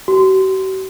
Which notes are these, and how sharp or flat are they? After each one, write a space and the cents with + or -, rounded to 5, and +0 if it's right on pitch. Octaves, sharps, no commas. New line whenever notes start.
F#4 +45